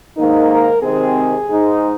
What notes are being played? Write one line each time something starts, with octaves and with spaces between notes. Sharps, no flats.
G#2 D#3 A#3 D#4 A#4
A#4
C3 D#3 G#3 C4 G#4
G#2 G#3 D#4